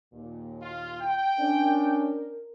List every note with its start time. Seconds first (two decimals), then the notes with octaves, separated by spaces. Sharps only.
0.13 D#2 A#2
0.62 F4
1.00 G5
1.39 C#4 D4 A#4